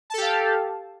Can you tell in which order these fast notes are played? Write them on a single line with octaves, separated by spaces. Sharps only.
A5 A4 G4 F5